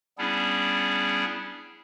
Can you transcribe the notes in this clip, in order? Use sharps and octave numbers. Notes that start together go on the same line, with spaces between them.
G3 B3 C#4 D4 E4 G#4